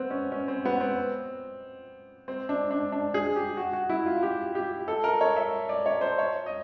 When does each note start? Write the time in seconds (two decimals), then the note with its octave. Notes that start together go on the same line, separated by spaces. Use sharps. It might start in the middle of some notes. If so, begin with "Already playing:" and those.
Already playing: B3 C4
0.10 C#4
0.32 C#4
0.48 C4
0.65 B3
0.80 C4
2.28 C4
2.49 D4
2.71 D4
2.92 D4
3.14 G#4
3.36 G4
3.57 F#4
3.73 F#4
3.89 E4
4.06 F4
4.23 G4
4.55 G4
4.88 A4
5.04 A#4
5.21 C#5
5.36 E5
5.69 D5
5.86 C#5
6.01 C5
6.18 C#5
6.46 D#5